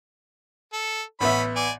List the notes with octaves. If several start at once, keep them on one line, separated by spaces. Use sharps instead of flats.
A4
A1 B3 C#4 E5 B5
D5 G#5